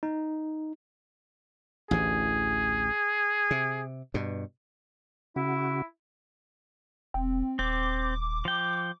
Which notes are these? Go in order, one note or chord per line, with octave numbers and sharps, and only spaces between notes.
D#4
A1 D2 E3 G#4
C3
G2 B2
C#3 E4 F#4
E1 C4
D#1 C4 D6
F3 G5